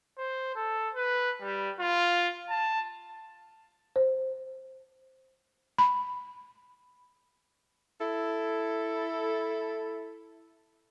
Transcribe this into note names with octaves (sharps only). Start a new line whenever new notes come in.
C5
A4
B4
G3
F4
A5
C5
B5
E4 A4